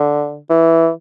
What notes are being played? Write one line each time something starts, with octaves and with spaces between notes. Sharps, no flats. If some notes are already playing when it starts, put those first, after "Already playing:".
Already playing: D3
E3